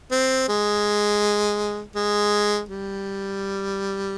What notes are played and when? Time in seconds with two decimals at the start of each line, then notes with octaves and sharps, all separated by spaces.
0.12 C4
0.49 G#3
1.95 G#3
2.69 G3